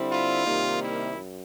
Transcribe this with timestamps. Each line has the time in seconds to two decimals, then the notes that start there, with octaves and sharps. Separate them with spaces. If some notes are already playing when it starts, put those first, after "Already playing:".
Already playing: D3 G3 C4 E4
0.12 F4
0.46 C3 D#3 G3 A#3 D#4
0.81 E4
1.15 F#2